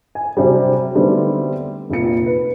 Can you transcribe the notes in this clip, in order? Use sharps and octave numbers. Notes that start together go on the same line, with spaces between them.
G#5
C3 F#3 G3
D3 G3 A3 B3 C4 D#4
F1 A#2 C#7
B4